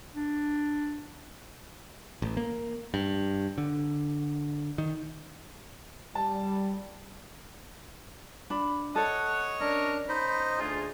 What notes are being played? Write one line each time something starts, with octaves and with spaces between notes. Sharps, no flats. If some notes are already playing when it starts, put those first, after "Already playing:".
D4
A1
A#3
G2
D3
D#3
G3 A5
D4 B5
A4 C#5 D#5 F#5
C#4 D4 A#4
D#4 C5 D#5 B5
D2 F4 G#4